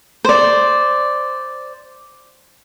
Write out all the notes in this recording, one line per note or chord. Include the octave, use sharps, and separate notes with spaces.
C5 D5